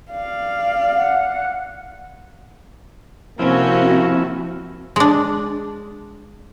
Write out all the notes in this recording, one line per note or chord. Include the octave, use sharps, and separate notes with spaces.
D5 F5
F#5
C3 F3 A#3 C4 C#4 E4 F#4
G#3 D4